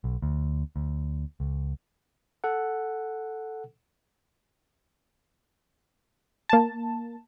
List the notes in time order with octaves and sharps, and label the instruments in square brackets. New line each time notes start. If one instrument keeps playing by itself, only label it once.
[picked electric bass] B1
D2
D2
C#2
[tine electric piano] A4 F#5
[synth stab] A#3 A5